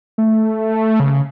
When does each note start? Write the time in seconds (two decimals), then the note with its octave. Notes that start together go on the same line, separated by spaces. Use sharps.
0.18 A3
1.00 C#3